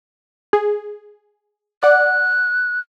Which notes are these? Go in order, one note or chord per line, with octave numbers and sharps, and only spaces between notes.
G#4
D5 F#5 F#6